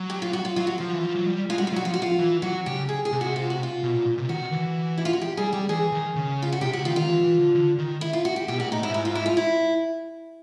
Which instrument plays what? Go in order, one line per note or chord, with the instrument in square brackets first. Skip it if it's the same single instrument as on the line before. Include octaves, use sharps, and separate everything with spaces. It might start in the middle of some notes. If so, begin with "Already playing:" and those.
Already playing: [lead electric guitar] F#3
[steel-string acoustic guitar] G4
F4
F#4
F4
[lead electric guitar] F#3 [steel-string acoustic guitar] F4
[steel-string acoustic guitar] F#4
[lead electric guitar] F3 [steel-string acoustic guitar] F4
[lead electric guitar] E3
F3
F#3
G3
[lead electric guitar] G#3 [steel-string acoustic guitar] F4
[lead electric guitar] G3 [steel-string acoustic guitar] F#4
[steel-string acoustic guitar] F4
[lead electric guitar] F#3
[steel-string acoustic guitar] F#4
[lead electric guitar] F3 [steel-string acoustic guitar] F4
[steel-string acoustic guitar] F#4
F4
[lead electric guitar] E3
[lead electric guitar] F#3 [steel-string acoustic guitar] F#4
[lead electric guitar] C#3 [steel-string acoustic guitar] G4
[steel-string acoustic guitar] G#4
G#4
[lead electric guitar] C3
[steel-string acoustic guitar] F#4
F4
F#4
F4
[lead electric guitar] B2
A#2
A#2
C3
[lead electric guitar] D#3 [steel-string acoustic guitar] F#4
[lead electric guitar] E3
[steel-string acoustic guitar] E4
F4
F#4
G4
[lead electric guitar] G3 [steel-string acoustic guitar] G#4
[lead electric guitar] G3 [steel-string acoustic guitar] G4
[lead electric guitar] E3 [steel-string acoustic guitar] G#4
[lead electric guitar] D#3
C#3
[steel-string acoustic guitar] F4
F#4
[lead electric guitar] C3 [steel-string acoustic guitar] G4
[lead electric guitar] C#3 [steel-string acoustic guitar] F#4
[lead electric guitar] D#3 [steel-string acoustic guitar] F4
[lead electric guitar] D#3 [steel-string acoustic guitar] F4
[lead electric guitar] E3
E3
D3
D3
D#3
[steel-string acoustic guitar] E4
F4
F#4
G4
[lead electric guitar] B2 [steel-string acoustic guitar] G4
[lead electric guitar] A#2 [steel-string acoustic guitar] F#4
[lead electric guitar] A2 [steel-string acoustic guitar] D#4
[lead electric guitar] G#2 [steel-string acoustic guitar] E4
[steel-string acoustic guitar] E4
F4
E4
F4
E4